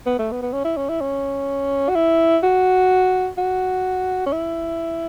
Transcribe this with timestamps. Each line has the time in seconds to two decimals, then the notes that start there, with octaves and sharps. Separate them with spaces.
0.06 B3
0.19 A3
0.31 B3
0.42 B3
0.53 C#4
0.64 E4
0.77 C#4
0.89 E4
1.01 C#4
1.89 F#4
1.95 E4
2.43 F#4
3.37 F#4
4.26 C#4
4.33 E4